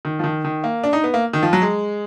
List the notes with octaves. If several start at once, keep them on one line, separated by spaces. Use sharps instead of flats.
D#3
F3
D#3
D#3
A#3
D4
D#4
B3
A#3
D#3
F3
F#3
G#3